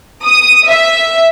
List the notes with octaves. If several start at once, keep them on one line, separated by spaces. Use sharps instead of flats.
D#6
E5